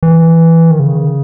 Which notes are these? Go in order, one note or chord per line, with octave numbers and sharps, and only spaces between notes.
E3
D#3
C#3